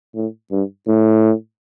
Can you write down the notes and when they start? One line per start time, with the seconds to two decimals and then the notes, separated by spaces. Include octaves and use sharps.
0.15 A2
0.51 G2
0.88 A2